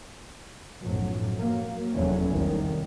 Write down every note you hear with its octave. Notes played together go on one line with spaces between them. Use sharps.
B1 F#2 A2 F3 F#3
F#3 A#3
F1 E2 F#3 A3 C#4
C2 D#3